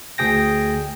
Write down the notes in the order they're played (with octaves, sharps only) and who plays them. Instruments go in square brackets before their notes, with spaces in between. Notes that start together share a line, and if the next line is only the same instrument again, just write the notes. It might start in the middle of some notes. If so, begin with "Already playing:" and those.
[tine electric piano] D2 G#4 G5 A#6